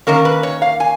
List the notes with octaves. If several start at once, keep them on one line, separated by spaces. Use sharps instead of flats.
D#3 A#3 C#4 A#4
B4
C#5
F5
G#5